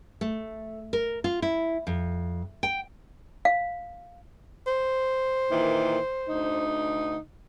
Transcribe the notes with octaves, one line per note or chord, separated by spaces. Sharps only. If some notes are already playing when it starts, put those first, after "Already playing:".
A3
A#4
F4
E4
F2
G5
F5
C5
A#2 D#3 E3
D2 D#4